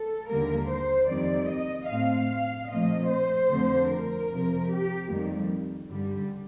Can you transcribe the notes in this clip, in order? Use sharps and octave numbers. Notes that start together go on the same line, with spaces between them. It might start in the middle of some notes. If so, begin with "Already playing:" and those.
Already playing: A4
D#2 D3 G3 A#3 A#4
C5
F2 D#3 G3 C4 D5
D#5
A2 A3 C4 F5
A#2 F3 A3 C4 D#5
C5
F2 D3 A3 C4
A#4
F2 C3 F3
G4
F2 D#3 G3 A#3
G2 D3 G3